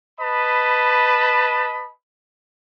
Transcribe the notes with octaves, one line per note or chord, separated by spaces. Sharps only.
B4 D#5 A5 B5